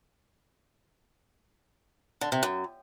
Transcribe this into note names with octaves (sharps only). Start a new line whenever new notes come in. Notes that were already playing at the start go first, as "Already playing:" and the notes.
D3
C3
F#2